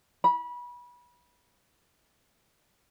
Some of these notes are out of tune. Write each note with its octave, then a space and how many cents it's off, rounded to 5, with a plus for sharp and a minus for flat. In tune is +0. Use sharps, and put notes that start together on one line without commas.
B5 -25